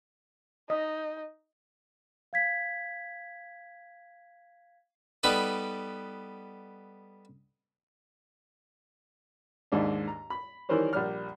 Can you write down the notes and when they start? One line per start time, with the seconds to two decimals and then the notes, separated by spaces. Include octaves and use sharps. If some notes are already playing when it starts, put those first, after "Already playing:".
0.70 D#4 D#5
2.33 F5 G#6 B6
5.23 G3 B3 D#4 A4 B4 D5
9.72 D#2 G#2 D4
10.07 A#5
10.30 B5
10.69 D#3 E3 G3 A#4 C5 C#5
10.93 A#1 G3 F6